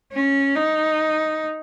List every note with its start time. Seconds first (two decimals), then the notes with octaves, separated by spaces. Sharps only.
0.13 C#4
0.55 D#4